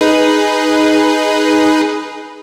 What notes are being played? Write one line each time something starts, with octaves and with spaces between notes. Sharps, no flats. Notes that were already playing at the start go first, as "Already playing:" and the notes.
D#4 G#4 B4